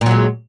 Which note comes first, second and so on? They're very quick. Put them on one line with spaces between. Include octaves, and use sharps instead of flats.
A#2 F#3 G#3